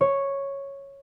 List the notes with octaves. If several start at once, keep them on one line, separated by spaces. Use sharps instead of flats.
C#5